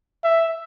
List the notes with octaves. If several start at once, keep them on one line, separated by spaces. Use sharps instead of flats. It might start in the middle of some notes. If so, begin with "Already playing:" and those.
E5